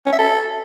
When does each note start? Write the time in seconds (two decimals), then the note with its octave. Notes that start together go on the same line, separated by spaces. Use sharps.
0.06 C#4
0.12 E5
0.19 A4